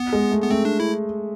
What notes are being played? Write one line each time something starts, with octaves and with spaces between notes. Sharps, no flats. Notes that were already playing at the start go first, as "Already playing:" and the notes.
Already playing: B3
G#3
A3
B3
A3 C4
D4
E4